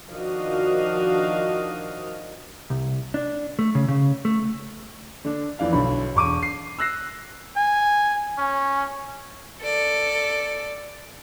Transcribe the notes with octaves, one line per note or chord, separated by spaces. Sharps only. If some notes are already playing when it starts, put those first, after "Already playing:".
D#3 F3 D4 F#4 D#5 F5
C2
D4
A3
C#3
C#3
A3
D3 D4
F2 E3 D5 F5
B1 D3 B5
E1 C#6 D6 D#7
C7
E6 F#6 A#6 C7
G#5
C#4
A4 D5